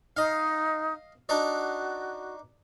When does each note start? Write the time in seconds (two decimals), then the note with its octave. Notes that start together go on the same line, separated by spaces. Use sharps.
0.17 D#4 D#5 F5
1.29 D4 D#4 F#4 D5